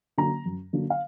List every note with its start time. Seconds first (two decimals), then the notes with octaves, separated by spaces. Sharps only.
0.18 D3 F#3 A#3 A#5
0.45 F#2
0.73 D3 F#3 A#3
0.90 F5